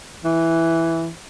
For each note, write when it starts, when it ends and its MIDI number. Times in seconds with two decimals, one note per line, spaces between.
0.24 1.09 52